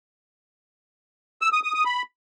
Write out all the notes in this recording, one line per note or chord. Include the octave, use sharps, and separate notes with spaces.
E6
D#6
D#6
D#6
B5